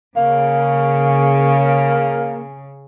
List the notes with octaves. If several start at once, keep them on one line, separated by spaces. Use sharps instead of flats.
C#3 A#3